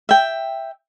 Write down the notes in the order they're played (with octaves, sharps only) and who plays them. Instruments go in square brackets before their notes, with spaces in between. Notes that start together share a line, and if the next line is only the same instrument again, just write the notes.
[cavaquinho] E5 G5